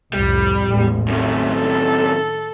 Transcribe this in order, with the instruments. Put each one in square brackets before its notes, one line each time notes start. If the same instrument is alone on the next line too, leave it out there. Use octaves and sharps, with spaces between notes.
[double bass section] C2 F2 A2 [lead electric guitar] G3
[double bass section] A1 E2 G#3
[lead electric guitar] F#2 C3 [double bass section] D#3 [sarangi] A3
[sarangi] A4